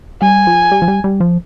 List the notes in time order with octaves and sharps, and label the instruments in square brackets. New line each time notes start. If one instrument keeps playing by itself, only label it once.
[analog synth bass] G3 [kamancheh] G#5
[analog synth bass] F3
G3
F3
G3
G3
F3